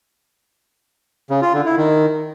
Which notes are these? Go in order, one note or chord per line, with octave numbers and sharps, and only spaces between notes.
C#3
F4
D3
E4
D#3